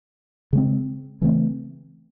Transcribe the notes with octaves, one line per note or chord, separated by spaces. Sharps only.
C#3 G#3 C4
C#3 E3 A3 C4